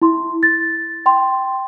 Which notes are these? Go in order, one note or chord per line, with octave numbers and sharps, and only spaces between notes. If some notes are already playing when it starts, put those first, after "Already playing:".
E4 C6
A6
G5 C6